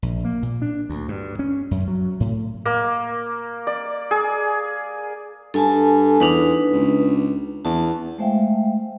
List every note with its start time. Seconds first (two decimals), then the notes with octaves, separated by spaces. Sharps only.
0.02 A#1
0.25 A#3
0.42 A#2
0.62 D4
0.89 D2
1.08 G2
1.39 C#4
1.71 F#2
1.88 F#3
2.20 A2
2.65 A#3
3.67 D5
4.11 G#4
5.54 G2 A4 G#5 A5
6.20 E2 D4 D#4 B4
6.73 C#2
7.65 E2 A5
8.18 G#3 A3 C5 E5 F5 G5